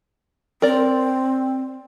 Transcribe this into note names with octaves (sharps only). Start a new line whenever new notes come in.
C4 A#4 D5